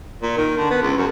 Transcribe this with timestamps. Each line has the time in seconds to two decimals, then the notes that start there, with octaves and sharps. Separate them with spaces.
0.22 A#2
0.37 D#3
0.58 D3
0.70 B3
0.82 C#2
0.97 F#2